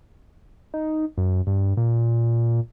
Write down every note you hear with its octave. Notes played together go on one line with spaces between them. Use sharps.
D#4
F#2
G2
A#2